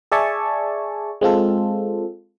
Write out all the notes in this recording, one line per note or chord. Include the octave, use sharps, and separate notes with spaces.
G#4 D5 E5 G#5 A5 C#6
G#3 C4 F4 A4